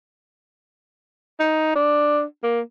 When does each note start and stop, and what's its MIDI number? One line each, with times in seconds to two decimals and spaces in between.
1.40 1.72 63
1.76 2.23 62
2.44 2.61 58